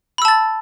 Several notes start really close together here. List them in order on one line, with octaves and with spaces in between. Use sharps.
B5 E6 A5 A6